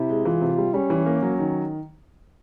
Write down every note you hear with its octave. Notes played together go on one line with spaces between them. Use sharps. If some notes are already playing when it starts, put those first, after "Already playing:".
Already playing: C3 E4
G#3
E3 F4
C3
G3
G3 C#4
E3
A#3
F#3
D#3